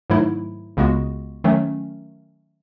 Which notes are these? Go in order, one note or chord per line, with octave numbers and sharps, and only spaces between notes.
G#2 D#3 F#3 A3 E4
C#2 C#3 G#3 B3 F#4
D#3 F#3 A3 C#4